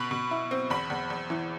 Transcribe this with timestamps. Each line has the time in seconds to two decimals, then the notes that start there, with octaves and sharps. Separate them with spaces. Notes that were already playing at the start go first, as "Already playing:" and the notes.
Already playing: B2 B5
0.11 B2
0.31 E4
0.51 C4
0.70 E2 B5
0.90 E2
1.10 E2
1.30 E3